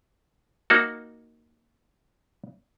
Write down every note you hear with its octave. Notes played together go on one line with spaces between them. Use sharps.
A#3 D#4 F#4